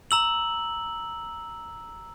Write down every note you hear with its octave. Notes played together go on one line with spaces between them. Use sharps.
A#5 E6 F#7